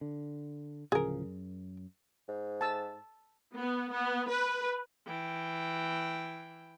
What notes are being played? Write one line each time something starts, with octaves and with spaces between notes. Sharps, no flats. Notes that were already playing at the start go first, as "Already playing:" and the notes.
D3
D1 C#3 F3 G#4 A#4
F#2
G#2
A5 E6
B3
B3
B4
E3 G5